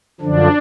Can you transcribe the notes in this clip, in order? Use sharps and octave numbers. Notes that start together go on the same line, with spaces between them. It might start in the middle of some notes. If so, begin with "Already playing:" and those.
F#2 D3 F3 D4